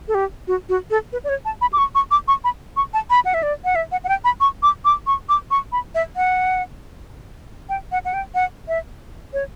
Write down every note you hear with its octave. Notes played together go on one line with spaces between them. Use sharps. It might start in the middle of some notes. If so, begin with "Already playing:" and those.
A4
G4
F#4
F#4
A4
B4
D5
C#5
A5
B5
D6
C#6
C#6
D6
C#6
B5
C#6
A5
B5
F#5
E5
D5
F#5
E5
F#5
F#5
G5
B5
C#6
D6
D6
C#6
D6
C#6
B5
E5
F#5
G5
F#5
F#5
G5
F#5
E5
C#5